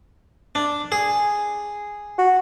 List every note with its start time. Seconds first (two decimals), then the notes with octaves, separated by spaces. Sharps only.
0.55 D4
0.92 G#4
2.18 F#4